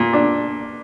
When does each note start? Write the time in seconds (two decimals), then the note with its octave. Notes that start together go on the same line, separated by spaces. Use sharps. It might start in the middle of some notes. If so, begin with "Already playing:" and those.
Already playing: A#2
0.13 D4